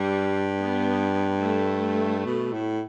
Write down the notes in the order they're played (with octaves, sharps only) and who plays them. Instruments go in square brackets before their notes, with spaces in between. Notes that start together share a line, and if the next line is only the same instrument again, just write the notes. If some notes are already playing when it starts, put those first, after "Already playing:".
Already playing: [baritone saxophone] G2 [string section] G3
[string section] B3
A3
[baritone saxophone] B2
A2